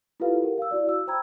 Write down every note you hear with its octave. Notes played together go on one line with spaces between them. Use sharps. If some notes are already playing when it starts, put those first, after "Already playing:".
E4 F4 G4 A4 B4 F5
G4 A#4 F#5
F5 E6
E4 F#4 D5
F5 E6
C5 G5 A#5 B5 E6 G#6